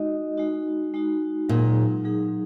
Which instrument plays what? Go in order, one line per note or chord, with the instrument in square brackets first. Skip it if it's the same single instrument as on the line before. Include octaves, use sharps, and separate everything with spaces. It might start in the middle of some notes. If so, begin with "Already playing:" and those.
Already playing: [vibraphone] G#3 D#4 F#4 D#5
G#3 D#4 F#4
G#3 D#4 F#4
[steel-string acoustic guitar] A#2 [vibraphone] F#3 D#4 G#4
[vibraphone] F#3 D#4 G#4